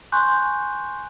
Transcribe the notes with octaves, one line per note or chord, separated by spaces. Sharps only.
G#5 C6 C#6 F#6 G6